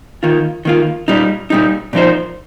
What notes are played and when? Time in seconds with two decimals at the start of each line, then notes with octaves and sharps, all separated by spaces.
0.23 D#3 A#3 F4
0.65 D#3 A#3 F4
1.08 A#2 G3 D#4
1.50 A#2 G3 D#4
1.93 A#2 F3 D#4 C5